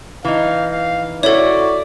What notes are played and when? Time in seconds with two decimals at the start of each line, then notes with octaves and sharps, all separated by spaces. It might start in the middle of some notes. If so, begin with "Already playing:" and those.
0.25 E3 D#4 F5
0.71 F5
1.23 E4 F#4 A4 C#5 D5